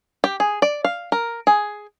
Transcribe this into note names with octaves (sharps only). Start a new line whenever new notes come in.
G4
G#4
D5
F5
A#4
G#4